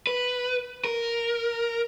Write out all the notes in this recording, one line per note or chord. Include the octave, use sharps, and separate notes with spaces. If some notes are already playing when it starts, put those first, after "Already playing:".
B4
A#4